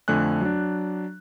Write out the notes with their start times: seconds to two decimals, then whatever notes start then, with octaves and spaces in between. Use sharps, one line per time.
0.08 F2 D3 A3 G#5 F#6
0.41 F#3 D4